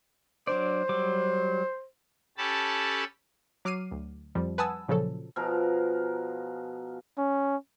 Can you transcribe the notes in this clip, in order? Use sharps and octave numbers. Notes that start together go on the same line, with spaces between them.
F#3 D4 C5 D5
F#3 G3 D6
C#4 G4 A4 A5 B5
F#3 D6 F6 C7 D#7
D2
F2 F3 G3
B4 F#5 G#5 A5 D#6 E6
A#2 C#3 F3 F#3 A4
B2 F3 G#4 A#4
C#4